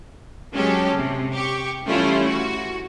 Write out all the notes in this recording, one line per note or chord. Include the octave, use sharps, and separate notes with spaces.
F#3 G#3 C#4 G4 A4
C3
G4 C#6
E3 G3 A3 C#4 E4 F4
F#4